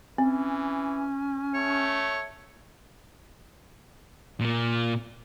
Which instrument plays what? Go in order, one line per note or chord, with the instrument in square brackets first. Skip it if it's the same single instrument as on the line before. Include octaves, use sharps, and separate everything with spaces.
[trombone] E3 [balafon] C4 [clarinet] C#4
[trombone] A3 [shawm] C#5
[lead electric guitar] A#2 A#3